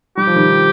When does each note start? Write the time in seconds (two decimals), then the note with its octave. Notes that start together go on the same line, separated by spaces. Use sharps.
0.17 G3 G4
0.27 F3
0.36 D#3 G3